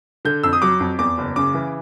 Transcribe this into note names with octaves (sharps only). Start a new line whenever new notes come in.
D3 G6
F2 E6
D#6
F#3 D6
F2
E2 D6
F#1
C#3 D6
E3